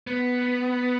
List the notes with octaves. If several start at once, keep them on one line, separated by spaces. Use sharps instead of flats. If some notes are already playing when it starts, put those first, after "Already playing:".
B3